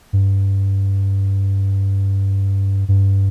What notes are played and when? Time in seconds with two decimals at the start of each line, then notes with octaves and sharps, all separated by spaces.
0.13 G2
2.88 G2